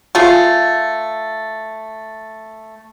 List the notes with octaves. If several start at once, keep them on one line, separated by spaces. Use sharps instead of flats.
A3 F4 G#4